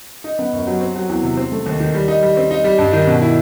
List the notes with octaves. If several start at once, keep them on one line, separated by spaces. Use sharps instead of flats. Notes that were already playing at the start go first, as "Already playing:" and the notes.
D#4
B3
F#2
F#3
C4
F#3
E2
C3
C4
A3
D#2
D#3
G3
D#4
G3
C4
D#4
G3
G2
D#3
B2
E4